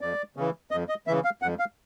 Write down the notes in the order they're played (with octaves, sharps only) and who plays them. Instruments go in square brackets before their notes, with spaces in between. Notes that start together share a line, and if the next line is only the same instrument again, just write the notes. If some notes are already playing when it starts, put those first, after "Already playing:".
[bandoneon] F2 D5
C#3 E3
F2 D#5
D#5
C#3 E3 E5
F5
F2 F#5
F5